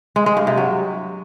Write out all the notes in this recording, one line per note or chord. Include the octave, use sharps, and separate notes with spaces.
G#3
G#3
G2
C3
F#3